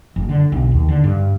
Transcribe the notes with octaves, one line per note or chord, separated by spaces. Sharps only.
F#1
D3
B1
D#2
D3
G2